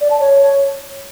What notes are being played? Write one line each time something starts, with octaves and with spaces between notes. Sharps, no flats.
D5
A5
C#5